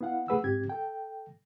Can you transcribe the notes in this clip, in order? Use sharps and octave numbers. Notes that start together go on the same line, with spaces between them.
B3 E4 F5 F#5
D#2 A3 G#4 B4 F#5 E6
G#2 C4 G4 G#6
A4 G5